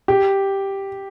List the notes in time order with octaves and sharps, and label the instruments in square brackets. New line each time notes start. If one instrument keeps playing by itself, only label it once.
[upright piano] G4